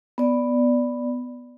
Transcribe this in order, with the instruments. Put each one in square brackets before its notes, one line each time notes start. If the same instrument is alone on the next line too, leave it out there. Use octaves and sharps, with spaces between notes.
[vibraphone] B3 D5